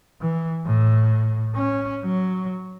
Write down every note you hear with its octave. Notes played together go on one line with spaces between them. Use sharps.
E3
A2
C#4
F#3